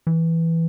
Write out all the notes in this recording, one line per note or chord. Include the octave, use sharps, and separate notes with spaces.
E3